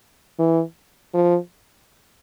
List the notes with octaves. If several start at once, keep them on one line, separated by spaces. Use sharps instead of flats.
E3
F3